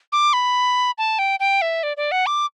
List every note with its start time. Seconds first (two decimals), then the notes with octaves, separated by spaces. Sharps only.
0.12 D6
0.33 B5
0.98 A5
1.19 G5
1.40 G5
1.62 E5
1.83 D5
1.97 D5
2.12 F#5
2.26 D6